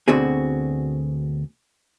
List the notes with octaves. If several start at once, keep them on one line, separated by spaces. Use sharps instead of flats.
D2 B2 D3 C4 F#4 G#4